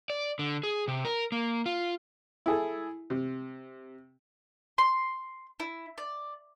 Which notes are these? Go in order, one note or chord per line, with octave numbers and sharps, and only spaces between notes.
D5
D3
G#4
C3
A#4
A#3
F4
E4 G#4 A4
C3
C6
E4
D5